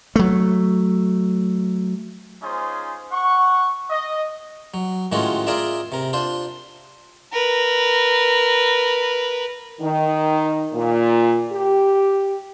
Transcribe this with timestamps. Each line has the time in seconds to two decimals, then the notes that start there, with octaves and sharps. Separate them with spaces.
0.16 F#3 A3
2.43 C#4 D#4 F4 G#4 C5
3.12 F#5 C#6
3.91 D#5
4.74 F#3
5.12 A2 D#3 G#3 C#4 F4 F#4
5.47 F4 G#4 A#4 D5 E5
5.92 C3 A#4
6.13 D4 F4 C5
7.33 A#4 B4
9.81 D#3
10.73 A#2
11.51 G4